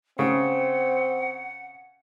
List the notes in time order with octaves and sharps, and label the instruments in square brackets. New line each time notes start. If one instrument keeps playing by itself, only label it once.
[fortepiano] C#3 [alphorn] C4 [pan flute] F#5